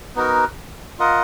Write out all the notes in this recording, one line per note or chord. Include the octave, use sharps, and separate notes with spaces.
B3 D#4 F#4 A#4
F4 A#4 D#5 F#5